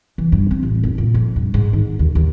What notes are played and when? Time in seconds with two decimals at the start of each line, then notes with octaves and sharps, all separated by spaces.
0.18 E3
0.32 G2
0.51 C4
0.63 A1
0.83 F1
0.98 A#2
1.14 F2
1.36 G2
1.54 G#2
1.73 D#3
1.99 D#2
2.15 D#2